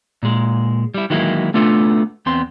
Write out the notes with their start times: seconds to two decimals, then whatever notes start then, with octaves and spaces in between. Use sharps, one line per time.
0.23 A#2 G#3
0.94 G3 E4
1.10 D#3 E3 F#3 G#3 A#3 E4
1.54 A3 B3 D4 F4 A4
2.26 E2 B3 C4 C6